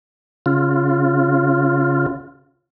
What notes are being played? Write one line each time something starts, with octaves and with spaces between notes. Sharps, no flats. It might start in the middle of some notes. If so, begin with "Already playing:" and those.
C#3 F4